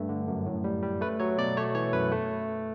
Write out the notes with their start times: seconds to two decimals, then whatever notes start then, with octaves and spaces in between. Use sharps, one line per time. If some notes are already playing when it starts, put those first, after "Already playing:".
Already playing: G2 A3
0.09 D3
0.28 F#2
0.46 A2
0.64 G3
0.83 G3
1.01 A3 B4
1.20 F#3 C#5
1.38 B2 D5
1.57 A3 C#5
1.75 E3 C#5
1.93 F#2 B4
2.12 A3